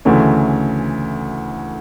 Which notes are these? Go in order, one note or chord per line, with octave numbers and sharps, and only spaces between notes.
D2 C#3 E3 A3 C#4